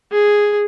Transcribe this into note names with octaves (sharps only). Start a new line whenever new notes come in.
G#4